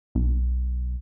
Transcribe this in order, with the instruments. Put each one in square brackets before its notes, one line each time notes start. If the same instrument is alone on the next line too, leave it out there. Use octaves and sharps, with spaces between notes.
[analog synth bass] B1